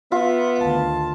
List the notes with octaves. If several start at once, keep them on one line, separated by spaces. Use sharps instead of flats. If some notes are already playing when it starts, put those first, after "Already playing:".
B3 F4 E5
D2 D#3 A5